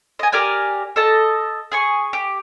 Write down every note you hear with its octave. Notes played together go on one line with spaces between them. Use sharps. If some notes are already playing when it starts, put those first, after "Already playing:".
D#5 G#5
G4 A#4 D5 G#5
A4 D#5 A5
G#4 G#5 C#6
G4